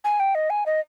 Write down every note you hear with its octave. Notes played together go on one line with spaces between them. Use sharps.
G#5
G5
D#5
G#5
D#5